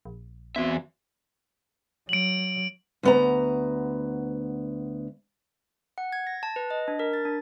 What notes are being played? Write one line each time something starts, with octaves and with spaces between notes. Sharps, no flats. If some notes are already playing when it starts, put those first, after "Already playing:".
A#1
E2 B3 C4 F#4 E5
F#3 D7 F#7
D2 B3 A#5
F#5
G#6
A#6
A5
B4
D#5
D4
A#4
A6
D4